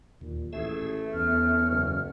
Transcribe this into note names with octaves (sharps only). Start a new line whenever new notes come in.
D#2 A#2
A1 A3 G#4 E6
E2 B3 C#4 F6
F#1